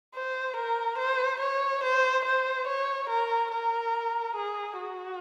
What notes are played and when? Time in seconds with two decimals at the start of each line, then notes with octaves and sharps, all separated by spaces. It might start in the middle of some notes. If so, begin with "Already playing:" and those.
0.15 C5
0.57 A#4
0.98 C5
1.40 C#5
1.83 C5
2.25 C5
2.67 C#5
3.10 A#4
3.52 A#4
4.35 G#4
4.79 F#4